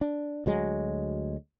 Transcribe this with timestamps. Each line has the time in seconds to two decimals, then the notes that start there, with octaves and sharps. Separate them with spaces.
0.01 D4
0.46 D2 F#3 G#3